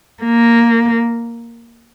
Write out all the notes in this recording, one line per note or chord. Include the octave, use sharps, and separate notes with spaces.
A#3